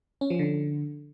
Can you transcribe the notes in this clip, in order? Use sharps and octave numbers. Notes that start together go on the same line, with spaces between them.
C#4
F3
D3